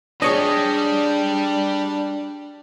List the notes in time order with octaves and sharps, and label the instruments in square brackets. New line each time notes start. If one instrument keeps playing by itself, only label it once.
[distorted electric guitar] G3 G4 [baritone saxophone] D4 [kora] G#4 C#5 D#5